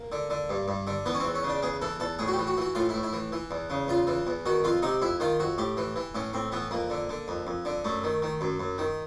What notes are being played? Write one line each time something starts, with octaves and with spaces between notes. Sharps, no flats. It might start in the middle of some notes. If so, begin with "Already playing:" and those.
Already playing: A#3
D3
D3
G2
G2
D3
E3 B3
C#4
E2 C4
C#4
C#3
D4
E2 G#4
E3 A4
E2 A4
A2 G#4
F#4
G4
E3
F#4
E3 F#4
A2 F4
E4
A2
E4
E3
E3
E2
C#3
E2 F4
E3
E2
D#3 F#4
F2 F4
C3 D#4
F2 E4
D#3 F4
F2 F#4
A2 G4
E3
E3
A2 C#4
A2 C4
E3 B3
F2 A#3
D3
D3
F2
F2
D3
F#2 A3
D#3
D#3
F#2
F#2
D#3